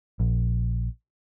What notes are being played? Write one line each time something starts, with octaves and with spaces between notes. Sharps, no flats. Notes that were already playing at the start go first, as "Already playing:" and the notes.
A#1